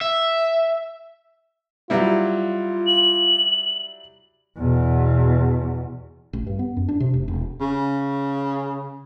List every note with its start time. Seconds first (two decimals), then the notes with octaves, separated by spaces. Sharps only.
0.01 E5
1.90 F#3 G3 E4 F4
2.87 F#7
4.57 E2 B2
6.33 A1
6.47 G2
6.59 B3
6.77 F#2
6.89 D4
7.00 C3
7.14 F1
7.28 E1
7.61 C#3